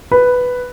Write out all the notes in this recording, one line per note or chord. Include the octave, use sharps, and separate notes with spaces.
B4